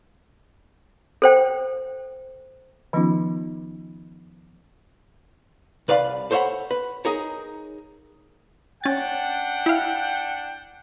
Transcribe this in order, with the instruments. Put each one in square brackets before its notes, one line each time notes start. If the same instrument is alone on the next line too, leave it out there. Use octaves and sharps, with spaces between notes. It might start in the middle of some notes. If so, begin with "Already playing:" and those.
[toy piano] A4 C5 G5
[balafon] D#3 F3 B3 C#4 D#4 F4
[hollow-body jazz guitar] C2 B4 D5 F5 B5
A4 C5 C#5 E5 F#5 B5
B4
D#4 G#4 A#4 C#5
[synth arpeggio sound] C#4 A6 [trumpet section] D4 F#5 G5
[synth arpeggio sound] E4 F5